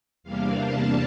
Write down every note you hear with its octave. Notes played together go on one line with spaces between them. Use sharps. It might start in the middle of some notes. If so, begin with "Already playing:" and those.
E2 C3 G3 A#3 D4 F5
A5